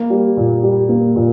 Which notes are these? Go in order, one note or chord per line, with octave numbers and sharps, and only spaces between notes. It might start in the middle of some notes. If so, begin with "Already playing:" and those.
Already playing: A#3
G3
A#2
G3
A#3
A#2